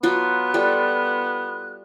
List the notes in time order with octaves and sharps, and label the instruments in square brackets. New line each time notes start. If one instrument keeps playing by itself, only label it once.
[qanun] F#3 F4 F#4 [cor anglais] B3 [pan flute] F#6
[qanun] G3 F4 A4